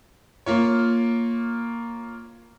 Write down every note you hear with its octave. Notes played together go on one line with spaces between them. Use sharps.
A#3 F4 C#5